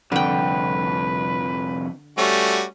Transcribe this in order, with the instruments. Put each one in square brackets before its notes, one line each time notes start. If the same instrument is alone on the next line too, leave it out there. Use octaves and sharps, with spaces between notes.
[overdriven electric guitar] C2 F2 [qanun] D3 G5 [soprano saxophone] B4
[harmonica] G3 A3 F#4 [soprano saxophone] C#4